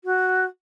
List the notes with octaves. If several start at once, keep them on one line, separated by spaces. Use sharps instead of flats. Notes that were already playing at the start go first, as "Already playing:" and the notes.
F#4